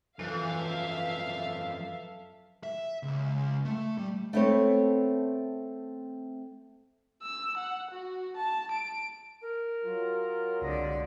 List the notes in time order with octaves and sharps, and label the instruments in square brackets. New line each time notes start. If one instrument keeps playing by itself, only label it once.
[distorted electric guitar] F#2 F3 [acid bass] E3 [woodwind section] A4 [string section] E5 F5
[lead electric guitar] E5
C#2
A3
G3
[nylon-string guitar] A3 B3 C4 A4 B4 C#5
[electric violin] E6
F#5
F#4
A5
D7
[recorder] A#4
[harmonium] F#3 F4
[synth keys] C2 A#6 [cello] D3 D5 [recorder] G#3